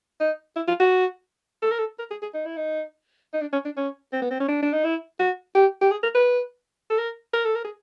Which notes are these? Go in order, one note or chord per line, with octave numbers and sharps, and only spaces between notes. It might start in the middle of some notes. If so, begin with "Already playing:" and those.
D#4
E4
F4
F#4
A4
A#4
A4
A#4
G#4
G#4
D#4
E4
D#4
D#4
D4
C#4
D4
C#4
C4
B3
C4
C#4
D4
D4
D#4
E4
F#4
G4
G4
G#4
A#4
B4
A4
A#4
A#4
A4
A#4
G#4